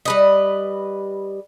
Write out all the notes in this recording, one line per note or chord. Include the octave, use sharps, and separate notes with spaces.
G3 B4 D#5